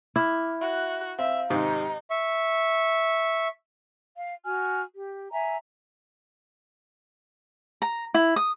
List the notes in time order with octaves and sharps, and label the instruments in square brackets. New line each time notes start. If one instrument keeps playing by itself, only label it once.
[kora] E4 [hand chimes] D6 F6
[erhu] F#4 [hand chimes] E5 F#6
[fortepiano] C4 [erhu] E5 [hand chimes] F5
[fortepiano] G#2 C3 D#3 [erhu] D#4 [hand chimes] G4
[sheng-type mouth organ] E5 C#6
[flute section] F5
F#4 G#5 F6
G4
E5 G#5 A#5
[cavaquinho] A#5
E4
D#6